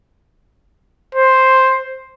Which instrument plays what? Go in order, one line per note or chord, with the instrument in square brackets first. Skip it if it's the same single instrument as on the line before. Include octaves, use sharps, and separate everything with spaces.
[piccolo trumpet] C5